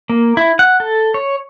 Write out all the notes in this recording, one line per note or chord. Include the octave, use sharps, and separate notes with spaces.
A#3
E4
F#5
A4
C#5